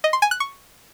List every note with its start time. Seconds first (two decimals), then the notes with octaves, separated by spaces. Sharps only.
0.04 D#5
0.13 C6
0.22 G#5
0.31 F#6
0.40 C#6